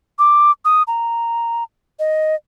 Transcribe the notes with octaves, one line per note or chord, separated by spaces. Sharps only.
D6
D#6
A#5
D#5